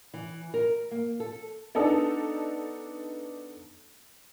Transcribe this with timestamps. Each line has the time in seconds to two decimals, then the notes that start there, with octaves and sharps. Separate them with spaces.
0.14 E3
0.54 A#4
0.91 A#3
1.20 A4
1.75 B3 D4 D#4 A4